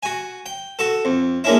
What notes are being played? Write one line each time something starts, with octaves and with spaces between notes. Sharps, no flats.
F#4 G#5
G5
F#4 A4
F2
G#3 A#3 C#4 D4 E4